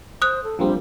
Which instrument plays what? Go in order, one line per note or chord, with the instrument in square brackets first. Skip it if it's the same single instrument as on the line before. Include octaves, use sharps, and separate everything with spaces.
[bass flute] C5 [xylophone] D#6 F#6
[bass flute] A4
[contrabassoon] A#1 [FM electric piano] F3 A#3 C4 [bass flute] G3